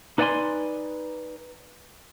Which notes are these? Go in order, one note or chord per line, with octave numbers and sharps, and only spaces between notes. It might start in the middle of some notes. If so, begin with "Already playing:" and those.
D#4 B4 D5 F#5 G#5 C6